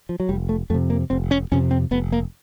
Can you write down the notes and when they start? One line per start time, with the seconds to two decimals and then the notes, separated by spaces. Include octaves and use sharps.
0.09 F3
0.20 F#3
0.29 F1 G3
0.49 A3
0.70 F2 A3
0.74 C3
0.90 A#3
1.10 F1 C4
1.31 C#4
1.52 F2 C3 C#4
1.71 C4
1.91 F1 B3
2.12 A#3